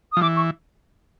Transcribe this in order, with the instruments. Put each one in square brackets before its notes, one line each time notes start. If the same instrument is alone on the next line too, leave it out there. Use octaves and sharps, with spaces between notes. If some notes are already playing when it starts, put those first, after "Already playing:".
[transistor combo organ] F3 [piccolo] D#6
[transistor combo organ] E3 [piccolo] D6
[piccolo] C#6